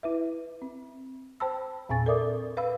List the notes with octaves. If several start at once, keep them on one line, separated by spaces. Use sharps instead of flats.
E4 B4 E5
C4
C5 G5 A5 B5 E6
E2 A#2 C4 G#5 C#6 A6
A4 A#4 D5 E5 D6 D#6
B4 F5 B5 E6